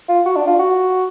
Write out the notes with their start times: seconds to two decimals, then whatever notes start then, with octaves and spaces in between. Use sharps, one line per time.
0.09 F4
0.26 F#4
0.36 D4
0.47 F4
0.59 F#4